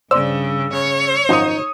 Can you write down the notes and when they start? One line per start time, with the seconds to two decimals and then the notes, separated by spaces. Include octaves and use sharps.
0.11 G2 C#3 C5 D5 E6
0.73 C#3 C#5
1.29 G#1 F#2 F3 D#4 D#6